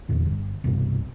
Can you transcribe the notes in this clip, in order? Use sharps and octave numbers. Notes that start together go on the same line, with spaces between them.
E2 A#2 D3
G1
C2 G2 B2